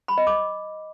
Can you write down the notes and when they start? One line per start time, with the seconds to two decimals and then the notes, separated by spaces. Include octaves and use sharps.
0.08 B5
0.18 D#5
0.27 D6